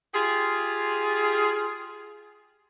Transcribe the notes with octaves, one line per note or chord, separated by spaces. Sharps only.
F4 G4 G#4